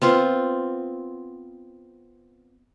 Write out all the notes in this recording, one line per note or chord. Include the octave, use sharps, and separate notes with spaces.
B3 C4 F4 C5